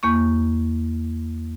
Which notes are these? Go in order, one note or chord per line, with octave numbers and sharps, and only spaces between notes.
E2 A#3 C#6